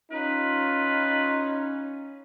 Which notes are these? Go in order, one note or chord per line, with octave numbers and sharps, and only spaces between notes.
C#4 D#4 F4 B4